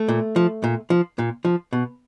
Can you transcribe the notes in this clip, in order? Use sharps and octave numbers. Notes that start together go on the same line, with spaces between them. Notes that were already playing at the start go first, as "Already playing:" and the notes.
Already playing: A3
A#2
F3
A#2
F3
A#2
F3
B2